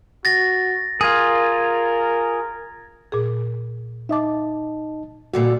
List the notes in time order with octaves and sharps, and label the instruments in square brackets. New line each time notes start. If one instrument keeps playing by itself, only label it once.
[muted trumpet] F#4 [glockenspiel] A6 A#6
[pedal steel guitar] F4 G#4 [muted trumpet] A#4 [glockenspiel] G#6
[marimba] A#2 G#4
[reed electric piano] D#4 D#5 A5 [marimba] E5 D6
[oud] A#2 D3 G3 [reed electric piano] F#4